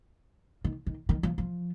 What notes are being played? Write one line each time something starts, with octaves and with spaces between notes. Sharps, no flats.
D#3
D#3
D#3
F3
F3